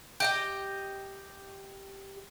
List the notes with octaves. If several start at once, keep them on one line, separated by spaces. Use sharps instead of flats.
G4 D#5 G5